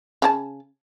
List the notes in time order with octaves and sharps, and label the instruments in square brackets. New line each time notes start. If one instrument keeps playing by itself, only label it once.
[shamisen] C#3 F#4 A5